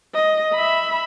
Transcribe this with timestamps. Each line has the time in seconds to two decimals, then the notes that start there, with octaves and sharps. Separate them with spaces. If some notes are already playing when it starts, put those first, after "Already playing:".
0.15 D#5
0.54 E5 B5